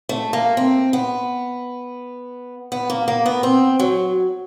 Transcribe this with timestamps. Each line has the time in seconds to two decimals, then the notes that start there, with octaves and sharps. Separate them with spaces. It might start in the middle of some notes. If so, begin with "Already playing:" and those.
0.09 A3
0.33 A#3
0.57 C4
0.93 B3
2.72 B3
2.90 A#3
3.08 A#3
3.26 B3
3.43 C4
3.79 F#3